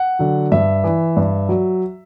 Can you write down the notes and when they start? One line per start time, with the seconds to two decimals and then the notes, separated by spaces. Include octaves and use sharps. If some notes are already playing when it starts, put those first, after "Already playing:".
Already playing: F#5
0.19 D3 F#3
0.52 G2 E5
0.84 E3
1.17 G2
1.49 F#3